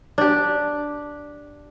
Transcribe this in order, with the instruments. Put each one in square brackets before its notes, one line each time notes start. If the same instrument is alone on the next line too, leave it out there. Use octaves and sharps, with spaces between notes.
[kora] D4 G4